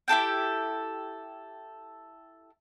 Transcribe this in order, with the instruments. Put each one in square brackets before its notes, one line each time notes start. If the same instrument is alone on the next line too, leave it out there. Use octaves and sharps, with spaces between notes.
[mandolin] E4 G4 A4 G5